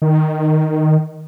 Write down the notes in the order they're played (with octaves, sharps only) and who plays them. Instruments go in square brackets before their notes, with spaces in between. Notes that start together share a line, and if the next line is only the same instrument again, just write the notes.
[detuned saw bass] D#3